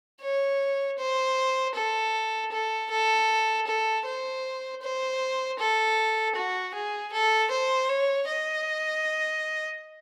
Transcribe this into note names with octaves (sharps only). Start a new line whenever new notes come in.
C#5
C5
A4
A4
A4
A4
C5
C5
A4
F#4
G#4
A4
C5
C#5
D#5